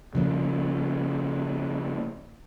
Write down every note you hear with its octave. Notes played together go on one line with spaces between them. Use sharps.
C#3 F3 A#3